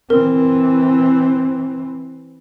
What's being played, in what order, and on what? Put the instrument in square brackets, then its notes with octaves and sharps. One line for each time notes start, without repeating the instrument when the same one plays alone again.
[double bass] E3 C4 [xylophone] A#4